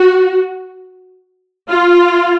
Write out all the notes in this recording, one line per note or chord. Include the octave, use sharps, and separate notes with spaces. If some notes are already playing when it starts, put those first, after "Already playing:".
Already playing: F#4
F4